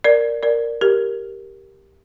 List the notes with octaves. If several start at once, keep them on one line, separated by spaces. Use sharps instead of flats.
A#4 D5
A#4 D5
G4 A#4